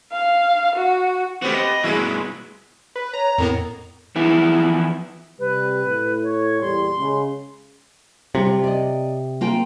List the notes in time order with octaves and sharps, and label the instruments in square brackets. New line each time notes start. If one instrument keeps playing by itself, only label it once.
[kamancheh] F5
F#4
[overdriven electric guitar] A3 F#4 [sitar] B3 C4 G4
[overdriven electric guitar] D#5
[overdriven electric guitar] G2 B2 [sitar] G#3 E4 F#4
[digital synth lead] B4
[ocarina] C#5 [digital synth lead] A#5
[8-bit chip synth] F2 A2 B3 [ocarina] A#4
[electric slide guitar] E3 F3 B3 E4
[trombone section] C3 G3 [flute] B4
[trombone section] A2
[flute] C#5
[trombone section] E2 A#2 G3 [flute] C6
[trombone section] C#3 G#3 C#4
[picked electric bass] C3 [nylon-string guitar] G3 F4
[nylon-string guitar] D5 D#5
A#3 F4 G5